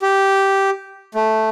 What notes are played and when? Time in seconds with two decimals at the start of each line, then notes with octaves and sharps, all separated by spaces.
0.02 G4
1.15 A3